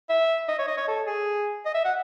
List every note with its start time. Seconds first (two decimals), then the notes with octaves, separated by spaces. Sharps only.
0.10 E5
0.49 D#5
0.59 C#5
0.68 D#5
0.77 C#5
0.88 A4
1.07 G#4
1.66 D#5
1.75 E5
1.85 F#5